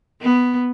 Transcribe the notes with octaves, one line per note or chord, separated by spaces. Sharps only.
B3